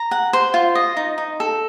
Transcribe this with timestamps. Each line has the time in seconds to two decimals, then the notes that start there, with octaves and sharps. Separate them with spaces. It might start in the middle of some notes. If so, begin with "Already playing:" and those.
Already playing: A#5
0.11 F#5
0.33 C5
0.54 F4
0.75 D#5
0.97 D#4
1.18 D#4
1.40 A4